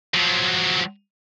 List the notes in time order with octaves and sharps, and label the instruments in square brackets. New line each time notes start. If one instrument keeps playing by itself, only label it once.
[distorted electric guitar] F3 F#3